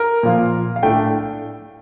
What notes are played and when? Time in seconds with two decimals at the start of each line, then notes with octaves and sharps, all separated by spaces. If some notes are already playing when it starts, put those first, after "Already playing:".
Already playing: A#4
0.23 A#2 F3 A#3 F4
0.76 F5
0.83 A2 A3 D4 G5